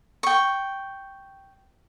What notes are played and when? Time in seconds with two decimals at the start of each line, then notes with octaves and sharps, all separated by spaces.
0.23 G5 C#6